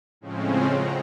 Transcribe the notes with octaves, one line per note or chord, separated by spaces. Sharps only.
A2 C#3 F3 G#3 C4 C#4
F#5 A#5